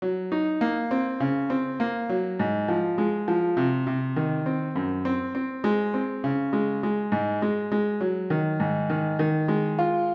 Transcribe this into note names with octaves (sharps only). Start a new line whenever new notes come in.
F#3
D#4
A#3
C4
C#3
C4
A#3
F#3
G#2
F3
G#3
F3
C3
C3
D#3
C4
F#2
C4
C4
G#3
C4
C#3
G#3
G#3
G#2
G#3
G#3
F#3
D#3
G#2
D#3
D#3
G#3
F4